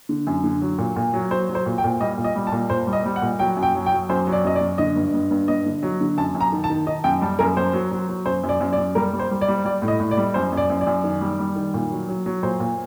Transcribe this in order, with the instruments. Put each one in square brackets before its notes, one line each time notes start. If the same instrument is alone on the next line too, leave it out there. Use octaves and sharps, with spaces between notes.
[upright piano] D3
F#2
D3
F#3
A#2
A#2
F#3
F#3 C5
F#3
C5
A#2
G5
A#2
G3 D#5
A#2
D#5
G3
A5
A#2
A#2 C5
G3
D#5
G3
F#5
A#2
F#3 G5
F#2
G5
F#3
G5
F#3
F#2 C5
F#3
D5
F#2 D#5
D5
F#2
D3 D#5
G2
G2
G2
G2 D#5
D3
F#3
D3
F#2 A5
F#2
A#5
D#3
A5
D#3
D#3 D#5
F#2 G5
G3 A5
F#2 A#4
F#2 C5
F#3
F#3
F#3
F#2 C5
F#2
D5
F#2
D5
F#2
G3 A#4
G3
C5
G3
D5
G3
G3 D5
A2
D#5
A2
D5
G3
F#2 C5
F#2
D5
F#2
D5
F#2
D#3
G3
G3
D#3
A#2
F#3
F#3
F#3
A#2 C5
A#2